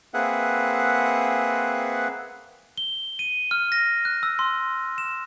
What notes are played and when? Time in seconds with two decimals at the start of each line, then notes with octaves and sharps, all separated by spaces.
0.14 A#3 C4 G#4 B4 E5 F#5
2.78 G7
3.19 D#7
3.51 F6
3.72 A#6
4.05 F#6
4.23 E6
4.39 C6
4.98 E7